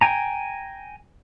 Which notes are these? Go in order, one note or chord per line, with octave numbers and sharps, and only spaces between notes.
G5 G#5 A#5